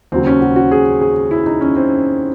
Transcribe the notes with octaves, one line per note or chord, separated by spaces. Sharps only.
D#2 C#3 F#3 C4
C#4
F#4
F#4
G#4
G#4
E4
D#4
C#4
C4